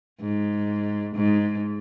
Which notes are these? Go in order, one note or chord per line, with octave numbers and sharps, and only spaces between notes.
G#2
G#2